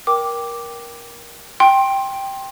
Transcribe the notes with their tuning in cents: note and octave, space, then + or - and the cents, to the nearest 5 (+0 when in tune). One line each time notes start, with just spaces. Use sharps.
A#4 +20 G5 +0 D6 +0
G5 +0 C6 +20